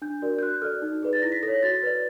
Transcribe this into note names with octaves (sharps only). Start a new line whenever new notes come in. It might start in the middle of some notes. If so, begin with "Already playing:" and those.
D4 G6
F#4 A#4 D5
G6
F#4 F#6
A4 D5 F6
D#4
G#4 B4 D5
A6
E4 A#6
B6
A4 C#5 A#6
F#4 A6
B4 D5